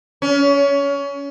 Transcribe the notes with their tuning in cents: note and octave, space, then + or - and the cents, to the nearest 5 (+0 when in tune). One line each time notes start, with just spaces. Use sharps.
C#4 +25